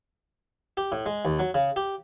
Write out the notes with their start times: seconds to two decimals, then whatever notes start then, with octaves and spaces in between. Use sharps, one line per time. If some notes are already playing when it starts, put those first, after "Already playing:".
0.77 G4
0.92 A2
1.06 G#3
1.25 D#2
1.39 F#3
1.54 C#3
1.76 G4